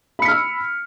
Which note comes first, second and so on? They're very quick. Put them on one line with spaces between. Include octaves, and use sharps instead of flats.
B5 C#7 B6 F6 E6